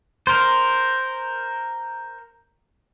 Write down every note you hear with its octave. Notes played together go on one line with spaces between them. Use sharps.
A#4 C5